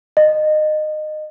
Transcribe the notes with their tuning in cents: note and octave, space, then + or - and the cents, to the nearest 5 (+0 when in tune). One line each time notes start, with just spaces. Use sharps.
D#5 -20